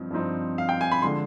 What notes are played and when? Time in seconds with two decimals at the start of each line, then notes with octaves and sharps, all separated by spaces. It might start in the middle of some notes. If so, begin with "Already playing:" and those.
Already playing: G2 F3 C4 D#4
0.11 G2 F3 C4 D#4
0.58 F5
0.69 G5
0.81 G#5
0.92 B5
1.02 D3 F3 G#3 D4 C6